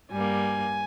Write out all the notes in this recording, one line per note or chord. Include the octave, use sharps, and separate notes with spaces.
G2 G3 A#3 G#5